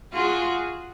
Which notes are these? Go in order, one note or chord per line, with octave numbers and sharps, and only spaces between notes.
F4 F#4 G#4